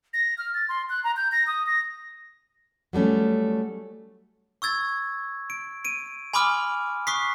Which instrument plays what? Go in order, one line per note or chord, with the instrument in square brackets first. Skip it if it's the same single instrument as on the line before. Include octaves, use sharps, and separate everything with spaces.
[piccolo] A#6
F6
A6
C6
F#6
A#5
G6
A#6
D#6
A#6
[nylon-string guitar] F#3 G3 A3 C#4
[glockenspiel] C#6 E6 G#6 A6
D7
D7 D#7
G#5 B5 C6 D6 D#6 F6
C#6 D#6 F#6 B6 C7